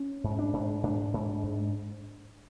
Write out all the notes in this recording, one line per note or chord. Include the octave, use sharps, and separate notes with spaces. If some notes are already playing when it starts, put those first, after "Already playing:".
Already playing: C#4
G#2
D4
G#2
G#2 D4
G#2
G#2